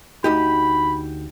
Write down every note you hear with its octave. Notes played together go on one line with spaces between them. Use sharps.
D2 D#4 G4 B5